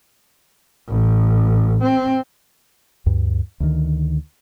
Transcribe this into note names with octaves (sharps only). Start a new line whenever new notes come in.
A1
C4
D2 G2
D2 D#3